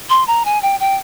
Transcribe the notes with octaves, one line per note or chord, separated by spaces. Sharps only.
C6
A#5
G#5
G5
G5